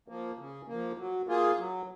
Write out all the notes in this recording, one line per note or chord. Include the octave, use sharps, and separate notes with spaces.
F3 A#3
C#3
F3 A#3
F#3
A#3 F4 G#4
F#3